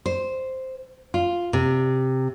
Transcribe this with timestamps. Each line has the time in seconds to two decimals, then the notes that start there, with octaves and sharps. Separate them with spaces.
0.06 C5
1.14 F4
1.53 C3